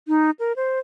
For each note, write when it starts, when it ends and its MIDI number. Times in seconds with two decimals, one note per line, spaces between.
0.08 0.31 63
0.39 0.53 70
0.56 0.79 72